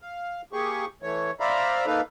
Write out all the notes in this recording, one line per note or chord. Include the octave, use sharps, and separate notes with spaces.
F5
A#3 G4 G#4 C#6
E3 A3 C#5
C5 D5 E5 F5 A#5 B5
A#3 D#4 A4 B4 F5